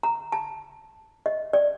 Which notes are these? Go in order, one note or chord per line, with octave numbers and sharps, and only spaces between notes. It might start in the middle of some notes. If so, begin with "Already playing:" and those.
A#5
A5
D#5
D5